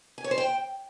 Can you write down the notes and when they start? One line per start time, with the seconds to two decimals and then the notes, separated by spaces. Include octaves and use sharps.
0.18 G#5
0.24 C#5
0.31 C5
0.38 G5